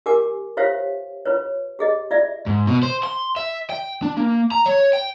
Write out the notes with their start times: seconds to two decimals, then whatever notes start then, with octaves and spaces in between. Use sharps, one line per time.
0.06 G4 A#4 G#5 D6
0.57 F4 G4 C5 C#5 E5 F5
1.25 F4 B4 C#5
1.79 G4 G#4 D#5
2.11 F4 D5 E5
2.46 G#2
2.67 B2
2.83 C5
3.04 C6
3.36 E5
3.70 G5
4.02 D4
4.17 A#3
4.52 A#5
4.66 C#5
4.93 G5